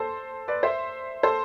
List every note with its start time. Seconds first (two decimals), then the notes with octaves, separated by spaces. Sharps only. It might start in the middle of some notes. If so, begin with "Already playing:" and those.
Already playing: A4 C5
0.48 B4 D5
0.63 C5 E5
1.23 A4 C5